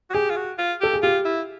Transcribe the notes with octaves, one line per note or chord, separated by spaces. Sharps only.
F#4
G4 G#4
F4
F#4
F4
G4 A4
G#4
F4 G4
E4